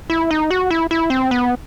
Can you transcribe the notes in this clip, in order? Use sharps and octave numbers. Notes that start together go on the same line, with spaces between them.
E4
D#4
F#4
E4
E4
C4
B3